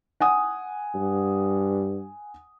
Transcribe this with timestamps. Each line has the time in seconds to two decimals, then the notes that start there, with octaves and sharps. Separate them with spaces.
0.20 F#5 G#5 D#6
0.95 G2